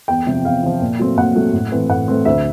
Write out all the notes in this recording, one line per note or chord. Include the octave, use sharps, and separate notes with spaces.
E2 G5
C3 F3
E2 F5
C3 F3
A#2
F#3 A3 C4
A#2 F#5
F#3 A3 C4
A2
E3 A3 C4
A2 F#5
E3 A3 C4
D2 E5